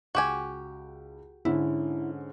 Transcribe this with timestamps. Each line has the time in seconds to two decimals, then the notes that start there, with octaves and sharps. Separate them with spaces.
0.15 C#2 F#4 G4 G#5
1.45 G#2 D3 C#4 E4